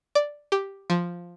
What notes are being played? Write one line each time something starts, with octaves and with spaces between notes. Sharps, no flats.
D5
G4
F3